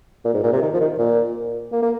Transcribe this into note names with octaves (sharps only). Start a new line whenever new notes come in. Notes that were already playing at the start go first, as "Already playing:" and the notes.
A#2
G#2
A#2
C3
D#3
F3
D#3
A#2
A#3
A#3